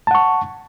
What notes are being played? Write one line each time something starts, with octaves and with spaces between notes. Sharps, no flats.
F#5 A5 C#6